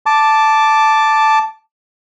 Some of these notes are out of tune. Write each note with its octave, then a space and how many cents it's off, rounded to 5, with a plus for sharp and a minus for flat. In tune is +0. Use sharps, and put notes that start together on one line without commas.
A5 +0 D6 +0